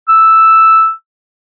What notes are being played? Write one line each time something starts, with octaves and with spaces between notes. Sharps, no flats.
E6